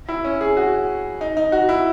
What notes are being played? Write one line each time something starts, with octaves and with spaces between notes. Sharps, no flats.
E4
C#4
G#4
F#4
D#4
D#4
F#4
E4